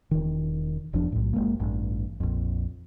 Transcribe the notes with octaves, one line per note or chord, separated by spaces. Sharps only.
E1 D#3
E1 E2 F3 D4
B1 A2
F#1 D#2 G#3 A#3
A1 G2
A#1 F2